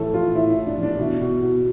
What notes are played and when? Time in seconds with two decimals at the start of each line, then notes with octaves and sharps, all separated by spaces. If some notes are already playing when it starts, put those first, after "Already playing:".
Already playing: A2 E3 A4
0.13 E3 F4
0.34 A2 E4
0.50 E4
0.56 A2
0.67 D4
0.77 E3
0.83 D4
0.99 B2 E4
1.20 B2
1.41 B2